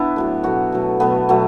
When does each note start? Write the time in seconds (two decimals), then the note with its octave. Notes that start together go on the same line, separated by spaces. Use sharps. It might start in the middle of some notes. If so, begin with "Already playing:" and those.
Already playing: B3 D4 E4
0.16 A2 F#3 A3
0.43 B2 F#3 A3 F#4
0.72 B2 F#3 A3
1.00 B2 F#3 A3 B3
1.29 B2 F#3 A3